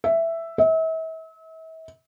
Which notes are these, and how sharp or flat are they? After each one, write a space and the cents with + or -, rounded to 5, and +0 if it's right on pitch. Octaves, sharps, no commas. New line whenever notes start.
E5 +5
E5 -40